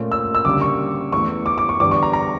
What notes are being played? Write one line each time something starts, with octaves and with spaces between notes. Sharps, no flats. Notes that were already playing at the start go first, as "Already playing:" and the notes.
Already playing: A#2 A3 C#4
E6
E6
D2 C#3 G3 A#3 D6
C#6
E2 E3 A3 C#6
D6
D6
C#6
E2 D3 G3 D4 D6
C#6
A#5
A#5